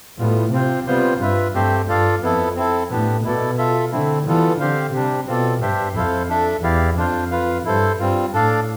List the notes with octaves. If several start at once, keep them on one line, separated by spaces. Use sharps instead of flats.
A2 G3 B3 F4
C3 C4 F4 C5
C3 G3 B3 F4 C5
G2 F4 B4 E5
G2 A3 C4 G4 C5
G2 F4 A4 D5 F5
F2 B3 E4 A4
C4 E4 A4
A2 B3 D4 G4
B2 E4 A4 D5
F4 A4 E5
D3 A3 C4 E4
E3 G3 B3 F4 A4
D3 C4 G4 C5 F5
C3 G3 D4 G4
B2 C4 F4 A4 D5
G2 D4 G4 C5 E5
F2 E4 A4 C5 F5
D4 A4 E5
E2 E4 G4 D5 F5
F2 D4 F4 C5 F5
F4 B4 F5
G2 E4 A4 C5
G2 G3 C4 F4
A2 D4 A4 D5 F5